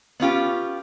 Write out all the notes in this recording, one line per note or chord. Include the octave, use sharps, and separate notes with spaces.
B3 C#4 F4 G4